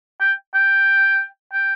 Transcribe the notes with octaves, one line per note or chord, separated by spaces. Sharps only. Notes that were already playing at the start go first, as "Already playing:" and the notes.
G5
G5
G5